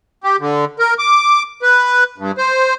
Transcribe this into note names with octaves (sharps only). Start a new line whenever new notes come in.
G4
D3
A#4
D6
B4
G2
C5